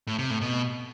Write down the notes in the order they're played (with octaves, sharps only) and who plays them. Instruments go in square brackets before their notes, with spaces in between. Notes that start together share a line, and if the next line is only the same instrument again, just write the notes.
[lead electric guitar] A2
C3
A2
B2